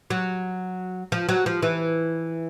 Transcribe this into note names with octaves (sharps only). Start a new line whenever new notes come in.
F#3
F3
F#3
F3
E3